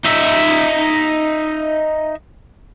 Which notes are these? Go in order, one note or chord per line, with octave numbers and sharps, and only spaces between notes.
D#4 E5